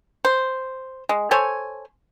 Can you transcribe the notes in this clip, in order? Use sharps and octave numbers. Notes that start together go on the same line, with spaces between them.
C5
G#3
A4 C5 C#5 G#5